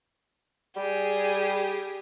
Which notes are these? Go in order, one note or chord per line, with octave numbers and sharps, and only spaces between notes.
G3 G4 G#4